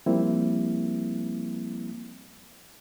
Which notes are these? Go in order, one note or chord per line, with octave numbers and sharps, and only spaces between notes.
F3 G3 A#3 C4 E4